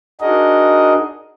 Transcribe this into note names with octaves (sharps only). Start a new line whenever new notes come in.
D4 D#4 F#4 G#4 A#4 D#5